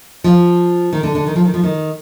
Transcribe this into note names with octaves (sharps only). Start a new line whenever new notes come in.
F3
D#3
D3
D3
D#3
F3
D#3
F3
D#3